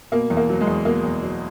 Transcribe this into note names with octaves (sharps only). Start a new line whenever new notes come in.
B2 A#3
E2
A#3
F#3
G#3
E2
B2 A#3
E2
F#3